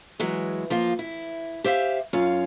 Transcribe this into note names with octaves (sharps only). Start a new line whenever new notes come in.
E3 F#3 G#3
F3 A#3 F4
E4
G4 C5 E5 F5
F#2 C#4 F4 C#5 F5